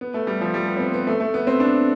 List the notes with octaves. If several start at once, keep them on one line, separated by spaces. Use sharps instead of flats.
B3
A3
G3
F3
G3
B3
C4
B3
B3
A3
A3
B3
C4
D4